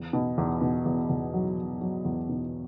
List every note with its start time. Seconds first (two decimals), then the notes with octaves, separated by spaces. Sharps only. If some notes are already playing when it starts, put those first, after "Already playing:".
Already playing: E2
0.13 B2
0.38 E2
0.61 B2
0.86 E2
1.09 E2
1.34 F#3
1.58 F#3
1.81 F#3
2.05 E2
2.29 B2